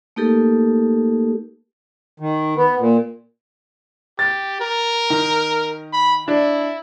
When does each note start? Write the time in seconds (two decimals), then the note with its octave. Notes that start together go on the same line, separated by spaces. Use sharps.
0.16 A3 A#3 D#4 G4 A4 A#4
2.20 D#3
2.56 B3
2.79 A#2
4.19 G4 A6
4.61 A#4
5.10 D#3
5.93 B5
6.28 D4 E4